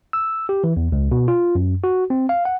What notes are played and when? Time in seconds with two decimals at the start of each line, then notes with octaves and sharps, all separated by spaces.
0.13 E6
0.49 G4
0.64 E3
0.77 E2
0.92 C#2
1.12 B2
1.28 F4
1.55 F#2
1.84 F#4
2.10 C4
2.29 F5
2.45 F#5